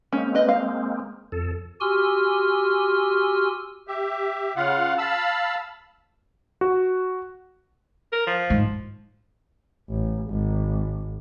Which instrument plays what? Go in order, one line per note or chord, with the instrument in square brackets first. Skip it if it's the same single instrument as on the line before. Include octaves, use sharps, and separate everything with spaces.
[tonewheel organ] G#3 A#3 C4 [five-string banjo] C#4
[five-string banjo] B4 D#5
F5
[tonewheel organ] F2 A4
[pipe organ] F#4 G4 G#5 C6 E6 F6
[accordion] G4 E5
C#3 F4 F5 F#5
F5 A5 B5 E6
[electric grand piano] F#4
[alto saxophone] A#4
F3
[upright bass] G#2
[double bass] A1
G#1